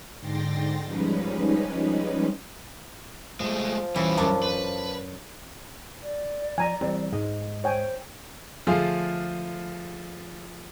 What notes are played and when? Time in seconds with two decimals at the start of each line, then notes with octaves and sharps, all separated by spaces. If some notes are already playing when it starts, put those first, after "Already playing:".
0.19 G#2 D3 G5 C6 A6 A#6
0.85 F3 G3 G#3 C#4 D#4 B4
3.40 F3 G#3 A3
3.96 E3 G3 C#4
4.18 F#2 D4 A5
4.43 B4
6.03 D5
6.58 F3 G#5 A#5
6.81 E3 G3 C4
7.12 G#2 G#3 D#5
7.64 C5 C#5 G5 G#5
8.67 D3 F3 A3 F4 G#4